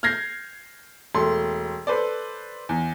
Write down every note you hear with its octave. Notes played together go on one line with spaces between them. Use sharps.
F6 G6 G#6 A#6 C7
E1 A3 C6
A4 B4 C5 D5
E2